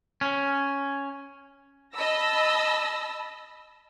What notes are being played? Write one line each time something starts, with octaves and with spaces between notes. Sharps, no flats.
C#4
D#5 A5 B5 E6 A#6